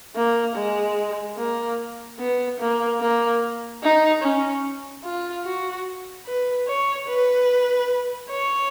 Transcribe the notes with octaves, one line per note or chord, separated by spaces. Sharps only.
A#3
G#3
A#3
B3
A#3
A#3
D#4
C#4
F4
F#4
B4
C#5
B4
C#5